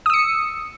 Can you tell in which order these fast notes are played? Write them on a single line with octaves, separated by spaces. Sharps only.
D#6 E6 C#7